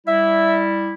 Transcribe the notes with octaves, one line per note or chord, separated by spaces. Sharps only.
G3 E4 E5